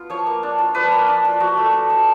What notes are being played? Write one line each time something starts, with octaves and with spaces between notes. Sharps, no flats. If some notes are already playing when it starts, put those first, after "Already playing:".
Already playing: B3 F4
F3 C#5
A#3
D4
F4
F3 B4
A#3
D4
F4
F3 F#4
A3
D4
F3